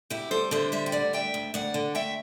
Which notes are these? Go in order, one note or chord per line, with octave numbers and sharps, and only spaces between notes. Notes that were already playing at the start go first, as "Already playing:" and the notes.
D2 E4 G4
G3 A4 C5
D3 C5 E5
G3 C5 E5
G5
D2 D5 F#5
D2 E5 G5
D2
D2 D5 F#5
D3
A3 E5 G5